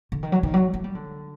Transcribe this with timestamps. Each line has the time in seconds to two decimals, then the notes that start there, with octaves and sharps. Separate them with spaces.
0.12 D3
0.23 D#3
0.32 F#3
0.43 D#3
0.54 F#3
0.74 A3
0.84 G3
0.95 D3